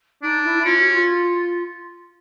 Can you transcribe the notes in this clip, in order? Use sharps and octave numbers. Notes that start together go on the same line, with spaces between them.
D4 D#4
E4
C#4 F4
F#4
F4